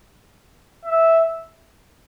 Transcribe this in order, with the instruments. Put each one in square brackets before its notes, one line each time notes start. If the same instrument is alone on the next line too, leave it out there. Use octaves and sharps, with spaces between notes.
[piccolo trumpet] E5